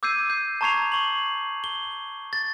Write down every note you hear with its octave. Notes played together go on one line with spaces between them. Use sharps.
D6 E6 G6 G#6 C7 D#7
G6 C7
A5 A#5 C#6 G#6 C7 F7
C#6 F#7
G7
A6